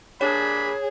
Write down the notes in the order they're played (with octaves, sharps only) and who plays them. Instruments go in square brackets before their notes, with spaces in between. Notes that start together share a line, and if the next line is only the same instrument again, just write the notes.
[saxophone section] A#2 G3 D4 [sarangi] G#4 [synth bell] C#5 [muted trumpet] B5